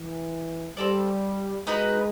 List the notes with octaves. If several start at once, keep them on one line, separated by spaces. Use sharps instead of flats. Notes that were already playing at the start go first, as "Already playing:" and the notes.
Already playing: E3
G3 C4 F4 A4 D5
G#3 B3 D#4 F#4 B4